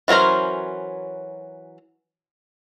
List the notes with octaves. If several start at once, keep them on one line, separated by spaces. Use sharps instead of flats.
E3 F#3 C#4 A#4 C5